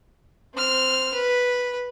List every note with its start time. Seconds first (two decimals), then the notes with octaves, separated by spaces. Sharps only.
0.54 C4 F6
1.14 B4